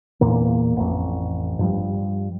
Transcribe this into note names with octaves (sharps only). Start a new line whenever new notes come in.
E2 A#2 A#3
A1 F2
G2 F3 G3